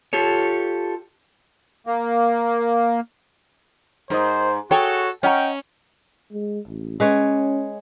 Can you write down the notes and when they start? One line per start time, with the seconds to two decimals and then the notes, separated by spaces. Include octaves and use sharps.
0.13 F4 G4 A4 C#5
1.87 A#3
4.10 G#2 A#4 C5 D#5
4.71 F#4 G#4 A4 C#5 G5
5.23 C#4 D#5 F#5 G5 A#5
6.32 G#3
6.68 A1
7.00 G#3 C#4 B4 C#5